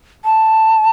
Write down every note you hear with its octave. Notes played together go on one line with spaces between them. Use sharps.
A5